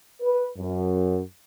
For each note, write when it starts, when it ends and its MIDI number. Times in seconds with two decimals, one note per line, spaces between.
0.21 0.46 71
0.56 1.19 42